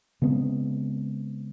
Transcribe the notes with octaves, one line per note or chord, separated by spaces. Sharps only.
C#3 G#3 B3 C4